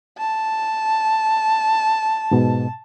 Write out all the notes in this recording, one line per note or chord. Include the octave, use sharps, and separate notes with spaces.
A5
G#2 B2